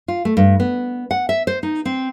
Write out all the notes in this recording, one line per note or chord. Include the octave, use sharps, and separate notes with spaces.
F4
A3
G2
B3
F#5
E5
C5
D#4
C4